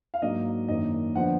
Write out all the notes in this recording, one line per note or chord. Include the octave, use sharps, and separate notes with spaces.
F5
G#2 F#3 A#3 D4 D#5
F#2 D#3 A#3 D4 D#5
D3 F3 B3 D4 F#5